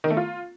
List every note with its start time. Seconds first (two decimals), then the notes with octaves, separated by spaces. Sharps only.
0.04 D#3
0.10 A3
0.17 F4